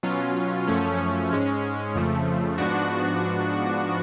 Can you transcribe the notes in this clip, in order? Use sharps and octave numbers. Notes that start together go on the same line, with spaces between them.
B2 F#3 C#4 F4
F#2 F3 A3 C#4
G#2 G#3 C#4
F2 C#3 F3 A3
G#2 F3 B3 D4 F#4